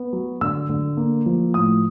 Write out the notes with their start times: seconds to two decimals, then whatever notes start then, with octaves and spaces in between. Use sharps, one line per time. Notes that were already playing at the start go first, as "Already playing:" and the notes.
Already playing: B3
0.13 F#3
0.41 D3 E6
0.69 D3
0.97 A#3
1.26 F3
1.54 A2 D#6